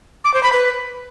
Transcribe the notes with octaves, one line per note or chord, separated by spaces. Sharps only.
D6
C5
B5
B4